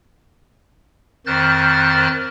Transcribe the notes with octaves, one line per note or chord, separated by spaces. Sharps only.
F2 D#3 C5 F6 F#6 A6